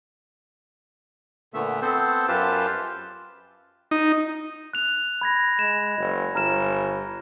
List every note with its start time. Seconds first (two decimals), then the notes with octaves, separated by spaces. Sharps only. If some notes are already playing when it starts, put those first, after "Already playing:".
1.54 A#2 D3 A3 B3 E5
1.82 B3 C4 A4 C5
2.28 F#2 F4 G4 B4 C5 A5
3.91 D#4
4.73 F#6 F7
5.21 B5 G#6 A#6
5.59 G#3 E7
5.98 F#1
6.35 G1 A#5 F6 E7